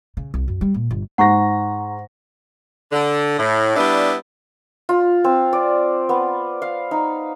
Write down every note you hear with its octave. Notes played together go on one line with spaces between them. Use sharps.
C#3
C2
F#2
G3
A#2
G1
G#2 F#5 A#5 C#6 A#6
D3
A2
G3 B3 D4 E4
F4
C4
D5
B3
F5
D#4